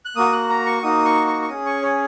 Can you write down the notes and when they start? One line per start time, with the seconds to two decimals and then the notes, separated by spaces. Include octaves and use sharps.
0.05 F#6
0.16 A#3 F#4 D#6
0.33 F#6
0.49 A#5
0.66 C#6
0.83 A#3 D#4 F#4 D#6
1.05 C#6
1.27 C#6
1.42 C#6
1.49 C#4 G#4 D#6
1.66 C#6
1.82 C#5